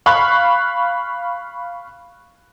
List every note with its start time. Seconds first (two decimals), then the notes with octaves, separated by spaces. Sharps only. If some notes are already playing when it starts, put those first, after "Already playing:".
0.06 F5 B5 C#6 F#6